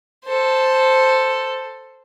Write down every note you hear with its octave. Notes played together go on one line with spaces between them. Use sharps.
A4 C5